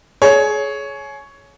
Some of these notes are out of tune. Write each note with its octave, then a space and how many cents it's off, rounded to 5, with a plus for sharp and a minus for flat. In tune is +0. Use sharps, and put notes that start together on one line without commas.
G#4 +30 C#5 +5